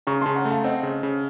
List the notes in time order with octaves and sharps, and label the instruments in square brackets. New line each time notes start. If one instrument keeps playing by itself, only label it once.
[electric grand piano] C#3 [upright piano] A#5 C#6
[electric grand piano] C#3 [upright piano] A5 C6
[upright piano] F#5 A#5
[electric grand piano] A3
[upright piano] F5 A5
[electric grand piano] C4 [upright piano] D#5 F#5
[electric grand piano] C#3
C#3